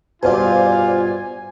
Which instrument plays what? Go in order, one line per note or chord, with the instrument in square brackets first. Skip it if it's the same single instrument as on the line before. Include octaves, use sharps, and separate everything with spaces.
[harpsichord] G2 B2 [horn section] F4 [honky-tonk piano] C5 D5 [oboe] G#5